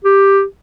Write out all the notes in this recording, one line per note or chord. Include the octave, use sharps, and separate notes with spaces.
G4